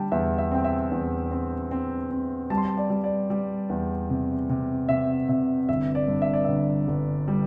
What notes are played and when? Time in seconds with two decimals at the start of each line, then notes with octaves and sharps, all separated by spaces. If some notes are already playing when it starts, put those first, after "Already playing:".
Already playing: D3 G3 G5 A5
0.12 E2 E5
0.38 E5
0.51 C4 G5
0.64 E5
0.91 E2
1.31 C4
1.71 C4
2.11 C4
2.50 G3 A5
2.57 C6
2.65 A5
2.77 D5
2.90 G3
3.04 D5
3.30 G3
3.70 E2
4.10 C3
4.49 C3
4.89 C3 E5
5.29 C3 E5
5.69 G1 E5
5.95 D5
6.08 G2
6.22 E5
6.33 D5
6.45 G1 E5
6.88 G1
7.28 G3